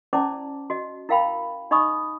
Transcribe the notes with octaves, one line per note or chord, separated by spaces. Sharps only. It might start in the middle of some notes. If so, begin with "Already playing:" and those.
C#4 E4 C5 D5 A5 D6
F#4 D#5
E4 A#4 F5 G5 B5
D#4 D#5 B5 C#6 D#6